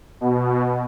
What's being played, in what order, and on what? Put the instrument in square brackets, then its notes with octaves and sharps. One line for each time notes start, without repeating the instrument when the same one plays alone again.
[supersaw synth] B2